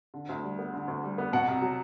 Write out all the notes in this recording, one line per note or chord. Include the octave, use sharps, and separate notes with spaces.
D3
D2
G3
B3
D3
D2
G3
B3
B2 F#5
C2
F#3